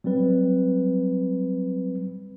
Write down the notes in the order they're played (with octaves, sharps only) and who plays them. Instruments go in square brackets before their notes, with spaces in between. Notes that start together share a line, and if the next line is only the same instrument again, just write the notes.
[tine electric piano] F#3 G3 C4 B4